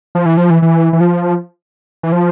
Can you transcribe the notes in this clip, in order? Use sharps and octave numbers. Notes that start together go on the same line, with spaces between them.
F3
E3
F3
E3
E3
E3
F3
E3
F3